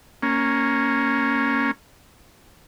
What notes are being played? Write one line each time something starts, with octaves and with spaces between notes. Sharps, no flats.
A#3 C#4